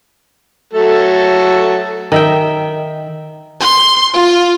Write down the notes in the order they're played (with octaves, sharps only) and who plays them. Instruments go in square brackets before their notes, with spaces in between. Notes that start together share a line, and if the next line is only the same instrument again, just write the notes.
[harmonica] F#3 A3 A4
[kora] D#3 E5 G5
[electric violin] C6
F4